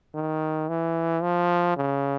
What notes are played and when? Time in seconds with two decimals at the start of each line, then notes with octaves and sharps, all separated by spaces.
0.15 D#3
0.69 E3
1.22 F3
1.77 C#3